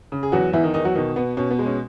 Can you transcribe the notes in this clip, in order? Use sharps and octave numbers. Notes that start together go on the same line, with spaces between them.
C#3
G#4
E2 F#3 F#4
E2 E3 E4
D#3 D#4
E2 D#3 D#4
F#3 F#4
B2 D#3 D#4
B2 B3
B2 C#4
B3
G#3
C#4